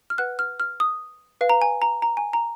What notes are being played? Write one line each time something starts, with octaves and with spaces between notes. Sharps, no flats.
F6
B4 F#5 F#6
F6
F6
D#6
B4 F5
A#5
G#5
A#5
A#5
G#5
A#5